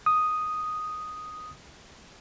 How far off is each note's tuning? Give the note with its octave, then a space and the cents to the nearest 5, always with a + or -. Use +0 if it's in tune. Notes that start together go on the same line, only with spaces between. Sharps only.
D#6 +0